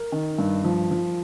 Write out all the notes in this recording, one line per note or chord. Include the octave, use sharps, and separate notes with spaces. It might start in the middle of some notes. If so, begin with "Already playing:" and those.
Already playing: A#4
D#3
G2
F3
F3